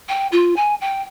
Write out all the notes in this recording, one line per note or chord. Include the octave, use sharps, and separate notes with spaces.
G5
F4
G#5
G5